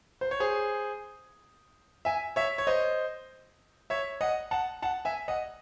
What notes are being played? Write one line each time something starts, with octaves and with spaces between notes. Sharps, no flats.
C5
C#5
G#4 C5
E5 G#5
C#5 E5
C#5
C5 D#5
C#5 E5
D#5 F#5
F#5 A5
F#5 A5
E5 G#5
D#5 F#5